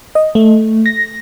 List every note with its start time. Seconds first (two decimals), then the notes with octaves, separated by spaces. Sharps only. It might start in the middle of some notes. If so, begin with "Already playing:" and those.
0.15 D#5
0.35 A3
0.86 A#6